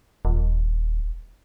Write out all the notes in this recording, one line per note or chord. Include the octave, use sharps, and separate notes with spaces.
D#1